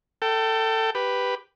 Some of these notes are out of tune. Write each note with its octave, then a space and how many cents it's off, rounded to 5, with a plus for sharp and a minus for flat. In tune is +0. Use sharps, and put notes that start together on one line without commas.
A4 +20 G5 -20
G4 +0 B4 +0